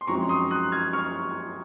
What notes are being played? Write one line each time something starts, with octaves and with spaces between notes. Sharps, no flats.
C6
F#2 F3 G#3 C4 D#4 A#5 C#6
C6 D#6
D#6 F#6
F6 G#6
C#6 F6